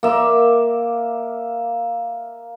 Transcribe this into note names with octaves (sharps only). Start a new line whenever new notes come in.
A#3 E5